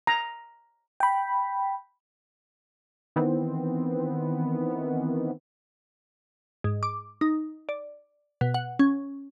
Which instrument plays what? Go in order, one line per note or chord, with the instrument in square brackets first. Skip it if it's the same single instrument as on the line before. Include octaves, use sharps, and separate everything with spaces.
[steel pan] A#5
[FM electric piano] G5 B5
[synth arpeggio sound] D#3 E3 B3 C4
[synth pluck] G#2
D6
D#4
D5
B2
F#5
C#4